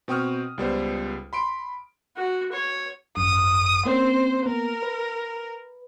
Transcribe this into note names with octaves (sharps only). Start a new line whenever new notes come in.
B2 C4 G5 C#6 D#6 F6
C#2 G3 B3 C5
B5 C6 D7
F#4
C#5
G#1 F#2 D#6
A#3 C4 C#4 C5
A#3 B3 A#4
B4